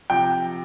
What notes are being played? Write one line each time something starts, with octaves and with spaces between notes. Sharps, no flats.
C3 F3 G5